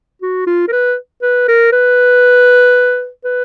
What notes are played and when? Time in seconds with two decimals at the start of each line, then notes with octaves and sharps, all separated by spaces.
0.22 F#4
0.47 F4
0.68 A#4
0.72 B4
1.22 B4
1.48 A#4
1.73 B4
3.25 B4